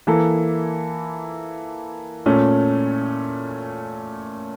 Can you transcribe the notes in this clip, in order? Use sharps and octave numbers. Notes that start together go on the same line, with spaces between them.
E3 A#3 E4 A4
A#2 A3 C#4